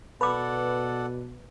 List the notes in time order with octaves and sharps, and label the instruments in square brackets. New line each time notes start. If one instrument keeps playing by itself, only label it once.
[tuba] B2 [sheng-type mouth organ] A4 D5 F#5 [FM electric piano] B4 [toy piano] B5 D6